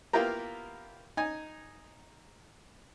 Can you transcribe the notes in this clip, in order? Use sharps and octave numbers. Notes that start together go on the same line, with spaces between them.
A#3 B3 E4 F4 G4 A#4
D#4 G#5